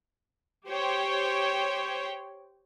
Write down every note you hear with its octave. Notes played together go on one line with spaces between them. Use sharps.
G4 C5 C#5 G5